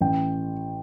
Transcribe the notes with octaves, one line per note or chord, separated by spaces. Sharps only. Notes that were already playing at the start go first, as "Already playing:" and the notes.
A1 G5